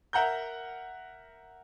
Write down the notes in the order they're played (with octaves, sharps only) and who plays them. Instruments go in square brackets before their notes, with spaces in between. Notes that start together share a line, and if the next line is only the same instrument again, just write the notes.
[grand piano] A#4 E5 F#5 A#5 G6